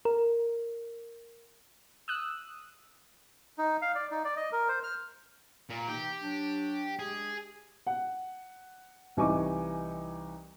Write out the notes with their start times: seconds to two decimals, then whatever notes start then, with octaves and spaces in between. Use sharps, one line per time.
0.05 A#4
2.08 D#6 E6 F#6
3.58 D#4
3.82 F5
3.95 D5
4.11 D#4
4.24 D5
4.36 D#5
4.52 A#4
4.68 C5
4.83 F6
5.70 A#2
5.87 C3 E3 D#4 G4
6.21 F#3 D4
6.99 G#3 D4 G4 G#4
7.87 F#5
9.17 C2 E3 D#4 G#5 C#6 D6